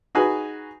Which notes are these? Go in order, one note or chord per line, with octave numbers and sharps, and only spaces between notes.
D#4 F#4 G#4 B4 G#5